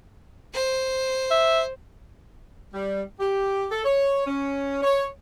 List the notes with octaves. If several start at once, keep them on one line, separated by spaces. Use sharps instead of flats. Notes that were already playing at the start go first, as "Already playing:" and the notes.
C5
E5
G3
G4
A4
C#5
C#4
C#5